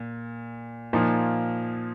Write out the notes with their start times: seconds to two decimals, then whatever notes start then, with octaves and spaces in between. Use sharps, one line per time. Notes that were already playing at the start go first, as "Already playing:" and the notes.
Already playing: A#2
0.93 A#2 F3 A#3 D#4